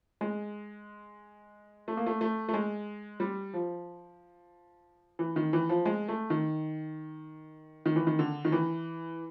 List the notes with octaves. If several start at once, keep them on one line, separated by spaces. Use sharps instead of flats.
G#3
A3
A#3
A3
A3
A3
G#3
G3
F3
E3
D#3
E3
F3
G#3
A3
D#3
D#3
E3
D#3
D3
D#3
E3